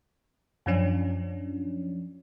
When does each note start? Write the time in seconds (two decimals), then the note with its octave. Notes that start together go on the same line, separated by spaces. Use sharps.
0.66 F#2 F3 C#4 D4